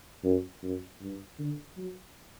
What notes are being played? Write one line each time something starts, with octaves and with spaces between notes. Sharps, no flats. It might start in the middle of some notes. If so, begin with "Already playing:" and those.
F#2
F#2
G2
D3
F#3